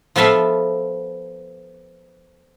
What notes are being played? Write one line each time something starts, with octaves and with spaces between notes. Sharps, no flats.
F3 B3 A4 E5 F5